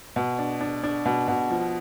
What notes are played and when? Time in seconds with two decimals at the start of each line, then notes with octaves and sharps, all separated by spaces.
0.16 B2
0.39 D4
0.61 D4
0.83 D4
1.06 B2
1.28 B2
1.50 F3